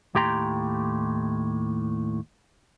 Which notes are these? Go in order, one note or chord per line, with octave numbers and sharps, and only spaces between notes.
D#2 A2 G4 G5 A#5 C6